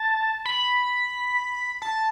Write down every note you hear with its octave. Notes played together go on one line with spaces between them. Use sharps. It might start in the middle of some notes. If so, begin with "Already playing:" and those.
Already playing: A5
B5
A5